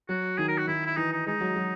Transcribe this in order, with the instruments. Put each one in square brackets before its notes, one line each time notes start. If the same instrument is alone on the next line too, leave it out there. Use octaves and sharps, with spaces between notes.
[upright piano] F#3 [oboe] F#4
[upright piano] D#3 [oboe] G#4
[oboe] A#4
F#4
[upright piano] D#3 [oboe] E4
[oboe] E4
[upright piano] E3 [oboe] D#4
[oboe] D#4
[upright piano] G#3 [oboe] D#4
[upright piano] F#3
F#3